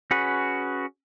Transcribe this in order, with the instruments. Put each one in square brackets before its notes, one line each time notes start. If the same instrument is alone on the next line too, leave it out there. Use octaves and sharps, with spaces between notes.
[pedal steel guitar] C#4 F#4 G#4 B4